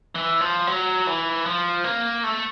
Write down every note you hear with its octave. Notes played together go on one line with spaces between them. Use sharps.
E3
F3
F#3
E3
F3
A#3
A3